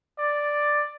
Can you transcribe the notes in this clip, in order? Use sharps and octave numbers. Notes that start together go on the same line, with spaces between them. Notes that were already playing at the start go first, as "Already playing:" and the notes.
D5